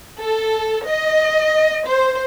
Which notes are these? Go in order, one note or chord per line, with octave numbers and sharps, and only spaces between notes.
A4
D#5
C5